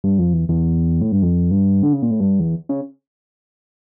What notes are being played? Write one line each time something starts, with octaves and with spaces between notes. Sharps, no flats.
G2
F2
E2
E2
A2
G2
F2
G2
D3
C#3
A#2
A2
G2
E2
C#3